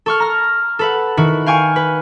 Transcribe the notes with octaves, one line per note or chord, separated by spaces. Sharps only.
A4 C#6 F6
A#5 F6
A4 B4 F#5
D#3 E4 F#4
F5 G5 G#5 C#6
B4